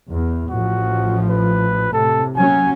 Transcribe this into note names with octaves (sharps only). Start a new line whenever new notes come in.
E2
A1 F3 F#4
B4
A2 C3 A4
F#3 A#3 C#4 G#5